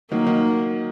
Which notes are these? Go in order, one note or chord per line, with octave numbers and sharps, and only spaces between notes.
D#3 F#3 A#3
D#3